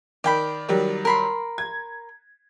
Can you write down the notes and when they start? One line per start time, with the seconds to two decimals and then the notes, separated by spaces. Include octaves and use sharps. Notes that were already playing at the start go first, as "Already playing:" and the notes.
0.24 D#3 D5 G5 B5
0.69 D#3 F#3 G3
1.05 A#4 B5 C6
1.58 G#6